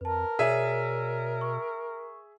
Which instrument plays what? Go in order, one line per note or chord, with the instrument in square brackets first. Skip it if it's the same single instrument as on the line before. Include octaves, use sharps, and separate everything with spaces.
[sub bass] F2 [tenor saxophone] A#4 [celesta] B4 A5
[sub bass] B2 [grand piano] G#4 E5 [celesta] C#5 D5 D#7
[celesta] C#6